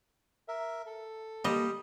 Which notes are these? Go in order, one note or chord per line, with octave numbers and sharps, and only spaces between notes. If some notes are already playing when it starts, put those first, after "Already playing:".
A#4 E5
A4
G3 A#3 D#5